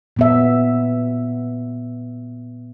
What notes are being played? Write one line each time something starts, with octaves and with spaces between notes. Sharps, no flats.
A#2 B3 E5